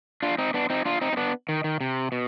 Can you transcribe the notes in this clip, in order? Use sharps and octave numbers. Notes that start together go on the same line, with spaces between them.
D4 F4
C4 D#4
B3 D4
C4 D#4
D4 F4
C4 D#4
C4
B3 D4
D#3
D#3
C3
B2